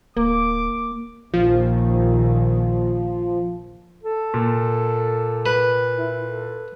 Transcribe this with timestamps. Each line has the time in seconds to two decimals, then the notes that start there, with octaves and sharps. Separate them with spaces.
0.17 D1 A#3 D6
1.34 A#1 D#2 D#3 F3
4.03 A4
4.34 A#2
5.46 B4
5.95 E4
6.23 A4